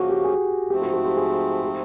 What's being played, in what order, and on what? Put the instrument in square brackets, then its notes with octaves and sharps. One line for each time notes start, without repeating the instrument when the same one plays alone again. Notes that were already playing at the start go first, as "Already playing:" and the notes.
Already playing: [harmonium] C#3 F3 A#3 C#4 [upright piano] F#4
[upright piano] G4
G#4
[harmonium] G#2 F3 A3 C4 [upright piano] G4
[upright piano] F#4
F#4
G4
G#4
G4